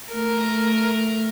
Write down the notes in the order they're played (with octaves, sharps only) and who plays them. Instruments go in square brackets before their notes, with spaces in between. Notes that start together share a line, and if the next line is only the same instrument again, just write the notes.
[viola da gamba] A3 A#4